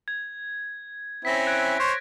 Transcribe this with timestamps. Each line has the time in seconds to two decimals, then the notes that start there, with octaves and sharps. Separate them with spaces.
0.08 G#6
1.25 C4 C#4 E4 A#6 B6
1.47 F#6 G#6 D7
1.79 C5 C#5